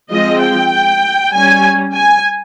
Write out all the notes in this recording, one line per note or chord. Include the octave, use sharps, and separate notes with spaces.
F3 G#3 C4 D#5
G5
G3 C#4 G#5
G#5